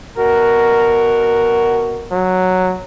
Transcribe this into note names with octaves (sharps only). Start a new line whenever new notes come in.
B2 F#4 A#4
F#3